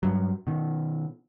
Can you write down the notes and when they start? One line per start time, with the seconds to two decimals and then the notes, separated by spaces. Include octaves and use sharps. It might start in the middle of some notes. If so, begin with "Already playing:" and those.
0.03 G2 F#3
0.47 B2 D#3